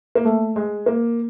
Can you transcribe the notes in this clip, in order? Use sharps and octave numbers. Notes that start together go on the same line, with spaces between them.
A#3
A3
G#3
A#3